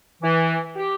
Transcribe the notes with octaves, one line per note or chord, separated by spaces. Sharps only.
E3
G4